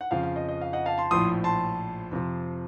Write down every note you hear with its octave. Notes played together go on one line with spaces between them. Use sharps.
F#5
F2 C#3 F3 F5
F5
D#5
D#5
F5
D#5 F#5
F5 A5
A5 C6
A#1 A2 F3 C6 D#6
A5 C6
F2 C3 F3